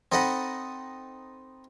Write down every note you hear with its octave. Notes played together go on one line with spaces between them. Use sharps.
C4 D#4 A4 D#5 F#5 B5